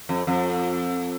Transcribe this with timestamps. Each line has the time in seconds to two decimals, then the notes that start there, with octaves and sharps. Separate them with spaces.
0.09 F2
0.27 F2